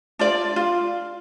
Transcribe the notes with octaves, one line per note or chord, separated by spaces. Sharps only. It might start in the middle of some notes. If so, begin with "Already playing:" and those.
D4 F4 D5
F4